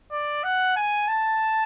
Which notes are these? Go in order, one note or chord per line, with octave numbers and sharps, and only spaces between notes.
D5
F#5
G#5
A5